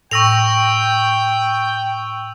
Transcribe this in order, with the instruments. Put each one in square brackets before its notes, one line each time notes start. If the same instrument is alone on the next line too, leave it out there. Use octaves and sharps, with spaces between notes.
[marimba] A2 A#6 [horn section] G5 [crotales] C#6 E6 F7